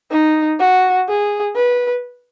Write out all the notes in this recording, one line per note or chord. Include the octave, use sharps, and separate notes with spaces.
D#4
F#4
G#4
B4